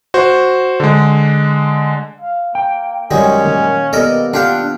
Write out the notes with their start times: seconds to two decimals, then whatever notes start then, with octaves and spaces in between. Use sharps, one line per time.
0.14 F#4 C5
0.80 D3 G#3
2.21 F5
2.55 A#3 G5
3.11 F#2 D#3 G3 G#3 C#4
3.45 D#3 A#3 A#4
3.93 A#3 B3 G4 A4 A#4 D5 D#5
4.34 D4 F4 G4 A4 F5 F#5